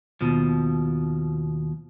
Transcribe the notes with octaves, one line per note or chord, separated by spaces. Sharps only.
D#2 B2 F3